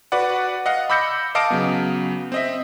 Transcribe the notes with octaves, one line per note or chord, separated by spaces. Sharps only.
F#4 B4 D5 F#5
D#5 F5 F#5
B5 D6 E6 G6 A#6 C#7
D#5 F5 A5 D6 D#6 D7
C#3 F#3 B3
C4 D#5 E5